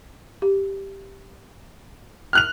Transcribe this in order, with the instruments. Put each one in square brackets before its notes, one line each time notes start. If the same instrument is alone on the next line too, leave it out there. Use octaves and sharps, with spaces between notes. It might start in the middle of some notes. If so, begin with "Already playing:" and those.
[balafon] G4
[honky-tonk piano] F6 F#6 F7